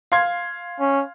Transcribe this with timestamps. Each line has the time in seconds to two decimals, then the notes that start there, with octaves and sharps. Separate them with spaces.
0.12 F5 C6 G#6
0.80 C#4